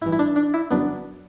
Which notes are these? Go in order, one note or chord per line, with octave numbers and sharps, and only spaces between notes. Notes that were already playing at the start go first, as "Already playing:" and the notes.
A1 G2 E3 E4
E4
D4
D4
E4
G1 F#2 F#3 B3 D4